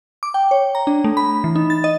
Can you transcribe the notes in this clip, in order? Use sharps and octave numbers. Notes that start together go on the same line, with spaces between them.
D6
G5
C#5
A#5
D4
A3
B5
E3
D#4
A6
D#5